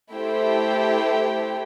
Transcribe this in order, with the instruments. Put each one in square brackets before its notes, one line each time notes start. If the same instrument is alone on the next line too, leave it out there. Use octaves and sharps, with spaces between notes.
[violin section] A3 E4 G4 C5 G5